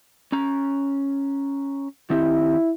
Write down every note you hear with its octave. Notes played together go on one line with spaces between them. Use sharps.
C#4 A#5
D#3 C4 E4 G4